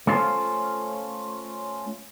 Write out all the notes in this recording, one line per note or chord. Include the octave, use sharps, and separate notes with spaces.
A3 C#4 F4 C5